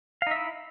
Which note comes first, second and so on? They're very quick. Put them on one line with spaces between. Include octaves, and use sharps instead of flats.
F5 D#4 E5 E4